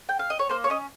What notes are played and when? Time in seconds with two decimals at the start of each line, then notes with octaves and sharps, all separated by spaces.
0.09 G5
0.19 F5
0.30 D#5
0.39 C#5
0.49 A#3 C5
0.64 C#5
0.70 C#4 D#5